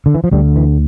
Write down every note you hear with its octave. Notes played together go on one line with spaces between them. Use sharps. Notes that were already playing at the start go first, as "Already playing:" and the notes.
D3
E3
F3
D2 D3 G3
E3